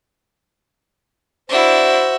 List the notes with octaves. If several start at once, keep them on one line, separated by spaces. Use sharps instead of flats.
D4 E4 F#4 C5 E5